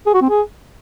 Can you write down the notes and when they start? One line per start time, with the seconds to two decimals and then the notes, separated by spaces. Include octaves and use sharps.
0.06 G#4
0.14 F#4
0.21 C4
0.29 G#4